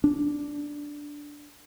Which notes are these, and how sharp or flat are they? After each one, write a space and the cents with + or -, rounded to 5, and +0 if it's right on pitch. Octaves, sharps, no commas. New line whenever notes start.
D4 -5